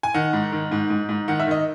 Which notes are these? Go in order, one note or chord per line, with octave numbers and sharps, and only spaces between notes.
G#5
D#3 F#5
G#2
D#3
G#2
G#2
G#2
D#3 F#5
E5
D#3 D#5